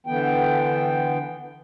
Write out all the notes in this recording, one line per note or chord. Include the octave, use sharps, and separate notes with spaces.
D3 E3 B3 G5